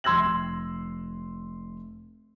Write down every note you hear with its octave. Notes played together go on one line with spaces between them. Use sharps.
F1 C6 E6 G#6 A#6 F#7